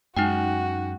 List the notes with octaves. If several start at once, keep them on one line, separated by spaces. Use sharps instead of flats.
F#2 G#3 D#4 F#4 G5